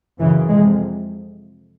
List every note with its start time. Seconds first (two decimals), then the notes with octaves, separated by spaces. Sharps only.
0.20 F#2 C#3 E3
0.49 F2 C3 G#3